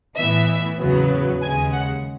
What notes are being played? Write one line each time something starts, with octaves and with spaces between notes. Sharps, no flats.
A2 E3 B3 E5
E2 C#3 F#3 B3
D#2 C#3 G#3 G#5
F#5